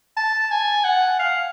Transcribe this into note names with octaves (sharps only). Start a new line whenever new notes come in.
A5
G#5
F#5
F5